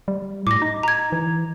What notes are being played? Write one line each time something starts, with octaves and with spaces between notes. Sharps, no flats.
G3
A2 D6 A#6
D#4
A#5 G#6
E3